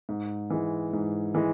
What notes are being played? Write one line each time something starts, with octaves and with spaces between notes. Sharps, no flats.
G#2
E3 G#3
G#2
E3 G#3